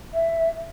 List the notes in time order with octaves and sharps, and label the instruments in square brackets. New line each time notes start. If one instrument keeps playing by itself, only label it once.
[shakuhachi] E5